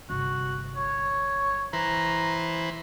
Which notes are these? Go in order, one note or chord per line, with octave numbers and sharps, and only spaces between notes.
G1 C3 F#4
C#5
E3 B4 C5 A#5